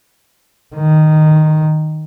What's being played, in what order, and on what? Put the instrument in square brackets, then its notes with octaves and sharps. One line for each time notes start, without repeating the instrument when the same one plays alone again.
[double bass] D#3